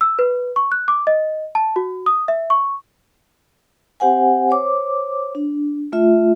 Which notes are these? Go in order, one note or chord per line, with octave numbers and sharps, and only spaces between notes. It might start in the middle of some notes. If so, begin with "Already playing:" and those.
E6
B4
C#6
F#6
D6
D#5
A5
F#4
D#6
E5
C#6
C4 G4 C5 F#5 G#5
C5 C#5 D6
D4
A3 F4 E5